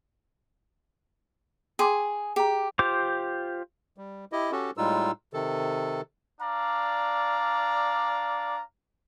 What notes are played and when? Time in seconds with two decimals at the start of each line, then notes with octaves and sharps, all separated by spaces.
1.79 G#4 G5 C6 D6
2.36 G4 G#4 A#5
2.79 F4 G4 C5 D6
3.97 G3
4.32 E4 G4 D#5
4.52 C#4 F#4 G4 A4
4.77 A2 G3 G#3 D#4 F4 E6
5.33 C3 D#3 A4
6.41 D4 D5 F5 A#5